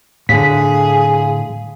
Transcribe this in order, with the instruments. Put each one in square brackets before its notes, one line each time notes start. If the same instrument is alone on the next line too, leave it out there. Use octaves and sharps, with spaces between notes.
[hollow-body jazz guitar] A2 D3 [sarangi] G#4 [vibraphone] F5 [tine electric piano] B6